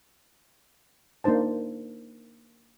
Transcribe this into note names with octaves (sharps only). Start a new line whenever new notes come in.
A#3 D4 D#4 C5 A5